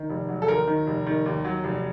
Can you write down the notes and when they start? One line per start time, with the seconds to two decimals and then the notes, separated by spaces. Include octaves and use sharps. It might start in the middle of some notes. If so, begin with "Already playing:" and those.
Already playing: D#3
0.10 F1
0.29 F#3
0.42 A4
0.48 D#2 A#4
0.67 D#3
0.87 F1
1.06 D#3
1.26 D#2
1.45 F#3
1.64 F1